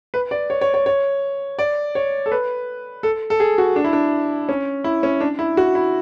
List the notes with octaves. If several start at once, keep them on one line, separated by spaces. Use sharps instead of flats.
B4
D5
C#5
C#5
C#5
C#5
D5
C#5
A4
B4
A4
A4
G#4
F#4
D4
E4
D4
C#4
E4
C#4
D4
E4
F#4
E4